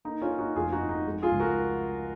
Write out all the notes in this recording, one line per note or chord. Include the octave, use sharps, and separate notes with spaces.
A#3 D#4
C#4 F4
A#3
D#4 F#4
F1 F4 G#4
D#4 F#4
F2
D#4
G#3
F4 G#4
C#2
F#4 A#4